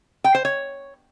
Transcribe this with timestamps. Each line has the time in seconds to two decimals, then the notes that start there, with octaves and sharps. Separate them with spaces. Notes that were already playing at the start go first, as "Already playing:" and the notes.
0.24 G5
0.35 C5
0.45 C#5